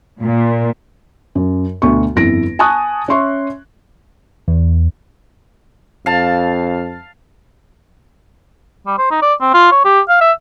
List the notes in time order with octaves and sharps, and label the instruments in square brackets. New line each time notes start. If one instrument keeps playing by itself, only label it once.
[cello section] A#2
[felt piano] F#2
D2 B2 C#6
G1 F2 E4 A#6 D7
G#5 A5 C#6 D#6 F#6
C#4 E5 C6 C#6
[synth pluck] E2
[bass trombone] F2 [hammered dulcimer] F5 A5
[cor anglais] G3
C5
D#4
D5
C4
F4
C#5
G4
F5
E5